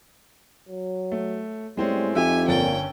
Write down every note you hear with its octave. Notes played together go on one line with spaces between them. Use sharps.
F#3
A3
A2 G3 G#3 C4 C#4
F2 D#4 G4 E5 G#5 E6
G1 A#2 C#4 G5 A6